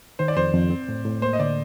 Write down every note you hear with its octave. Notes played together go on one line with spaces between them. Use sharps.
D#3 C5
D5
F2 C5
F2
C4
A2
A2
A#3 C5
D#5
D3 D5